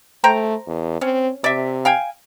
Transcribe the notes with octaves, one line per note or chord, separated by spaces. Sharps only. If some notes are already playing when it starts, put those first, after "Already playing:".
A3 C5 G5 A#5
E2
C4 C#4
C3 D5 E5
F5 G5 G#5